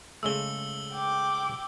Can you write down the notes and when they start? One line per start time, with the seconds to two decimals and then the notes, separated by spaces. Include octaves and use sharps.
0.23 C#3 G#3 A3 E6 G7
0.92 G5 D6